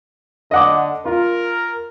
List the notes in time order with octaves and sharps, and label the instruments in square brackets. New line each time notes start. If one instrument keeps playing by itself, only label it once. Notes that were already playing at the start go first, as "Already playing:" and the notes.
[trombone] D3 [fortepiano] D#5 F#5 D6
[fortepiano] F4 [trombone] A#4